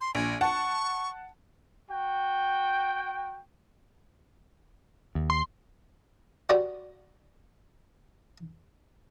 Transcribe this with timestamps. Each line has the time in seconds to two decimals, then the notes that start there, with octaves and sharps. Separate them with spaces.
0.01 C6
0.15 A#1 G#5
0.41 F#5 A5 C#6
1.90 F#4 G5
5.15 D#2
5.30 C6
6.49 F#4 G4 B4 C#5 D5 F#5